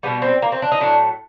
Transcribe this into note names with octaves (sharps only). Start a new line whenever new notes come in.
B2 G3 B3
C4
A#3
C4
D4
D#4
A2 F#3 A3 D4